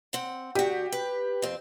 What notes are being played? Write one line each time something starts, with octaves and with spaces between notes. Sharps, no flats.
C4 F#5
D2 F#4 G4
B4
F2 C4